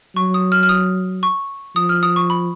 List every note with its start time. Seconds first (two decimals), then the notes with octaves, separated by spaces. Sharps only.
0.16 F#3 C#6
0.34 D#6
0.52 F6
0.63 F6
0.69 D#6
1.23 C#6
1.76 F3 D#6
1.89 F6
2.03 D#6
2.16 C#6
2.30 B5